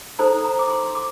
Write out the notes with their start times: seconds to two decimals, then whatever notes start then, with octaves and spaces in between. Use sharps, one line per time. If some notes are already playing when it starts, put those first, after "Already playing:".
0.19 D#4 A4 C5 A#5
0.44 A#5
0.59 D6
0.70 C6
0.95 D6